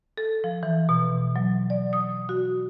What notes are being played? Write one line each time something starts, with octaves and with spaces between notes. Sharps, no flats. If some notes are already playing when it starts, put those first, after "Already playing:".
A4
F3
E3
B2
F#3
D5
D#6
F#4